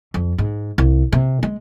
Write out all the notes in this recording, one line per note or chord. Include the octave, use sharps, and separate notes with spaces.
F2
G#2
C2
C3
G#3